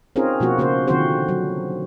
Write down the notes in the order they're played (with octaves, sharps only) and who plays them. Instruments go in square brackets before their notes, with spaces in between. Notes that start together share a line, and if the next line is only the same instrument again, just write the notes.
[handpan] C4 C#4 D#4 F4 G#4 A#4
B2 F3 A#3 F#4
C#3 A#3 F#4 C5
D3 D#3 F3 C4 F#4 C5
F#3